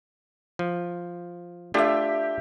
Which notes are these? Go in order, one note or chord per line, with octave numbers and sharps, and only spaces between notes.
F3
A3 D4 F4 G4 E5